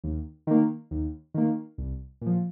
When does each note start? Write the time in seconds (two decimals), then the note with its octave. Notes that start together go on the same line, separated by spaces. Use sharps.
0.04 D#2
0.47 D#3 A#3
0.91 D#2
1.34 D#3 A#3
1.78 C2
2.21 A#2 F3